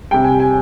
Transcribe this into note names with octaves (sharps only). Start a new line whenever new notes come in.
C3 G3 G5
G#5
G#5